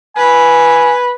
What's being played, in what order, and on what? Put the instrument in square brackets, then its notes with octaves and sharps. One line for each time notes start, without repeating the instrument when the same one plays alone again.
[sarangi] B4 [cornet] G#5